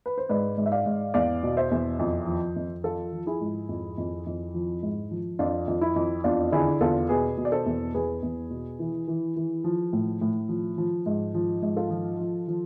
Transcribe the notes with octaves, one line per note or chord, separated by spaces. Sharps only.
B4
C5
G#2 B4 D5
G#2
E5
D5 F5
G#2
E2 D5 F5
B2
C5 E5
E2
F2
F3
F2
F3 F4 A4
F3
E4 G#4
G#2
F2
F2
F2
F3
G#2
F3
F2 D4 F4
F2
E4
F2
E2 D4 F4
D3 E4 G#4
E2 F4 A4
B2 G#4 B4
B2
D5
A4 C5
E2
E2 G#4 B4
E2
B2
E3
E3
E3
F3
A2
A2
F3
F3
G#2
F3
G#2
F4 A4
F3
F3
F3